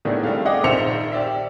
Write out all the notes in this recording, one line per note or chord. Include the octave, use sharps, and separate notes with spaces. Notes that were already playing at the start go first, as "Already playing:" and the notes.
A2 D#3 B3 D4 E4 G#4
G3 A3 C4 F5
G#4 D#5 F#5 G5 D6
A#1 D#3 C5 E5 C#7 F7
G4 D5 E5